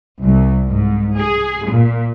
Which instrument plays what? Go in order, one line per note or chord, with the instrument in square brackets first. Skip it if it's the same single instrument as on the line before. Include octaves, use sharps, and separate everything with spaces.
[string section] C2
G#2
G#4
A#2